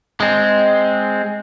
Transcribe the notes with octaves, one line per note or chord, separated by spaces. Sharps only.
G#3 C4